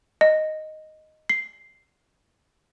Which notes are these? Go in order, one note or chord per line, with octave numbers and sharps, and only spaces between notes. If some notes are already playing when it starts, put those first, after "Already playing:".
D#5
C7